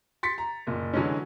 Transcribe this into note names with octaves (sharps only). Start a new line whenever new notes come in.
C6 A6 B6 C#7
A#5
F#1 A#2
D3 E3 F#3 G#3 C#4